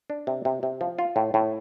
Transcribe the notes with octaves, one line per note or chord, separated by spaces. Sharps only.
D4
C3
C3
C3
F3
F4
A2
A2